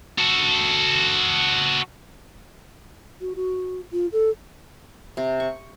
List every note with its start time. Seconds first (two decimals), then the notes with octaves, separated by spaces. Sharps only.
0.18 F#4 A4
3.21 F#4
3.35 F#4
3.92 F4
4.12 A4
5.17 C3
5.40 C#6